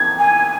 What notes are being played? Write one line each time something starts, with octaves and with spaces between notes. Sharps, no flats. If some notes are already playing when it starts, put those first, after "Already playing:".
Already playing: G#6
G#5